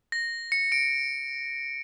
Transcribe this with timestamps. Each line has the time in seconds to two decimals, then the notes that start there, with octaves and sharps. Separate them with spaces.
0.12 A#6
0.52 C#7
0.72 D7